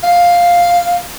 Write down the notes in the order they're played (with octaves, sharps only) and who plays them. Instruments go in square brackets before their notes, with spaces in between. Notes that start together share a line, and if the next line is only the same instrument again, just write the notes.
[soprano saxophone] F5